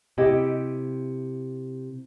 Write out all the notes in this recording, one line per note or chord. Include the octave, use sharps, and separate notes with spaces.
C3 E4 G4 D#5